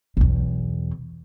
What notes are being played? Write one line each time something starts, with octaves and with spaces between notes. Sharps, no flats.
B1 E2